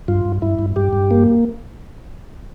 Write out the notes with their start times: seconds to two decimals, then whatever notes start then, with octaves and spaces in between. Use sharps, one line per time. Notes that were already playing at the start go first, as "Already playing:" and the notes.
0.08 G2 F4
0.25 G2
0.42 G2 E4
0.59 G2
0.76 G2 G4
0.93 G2
1.11 A#3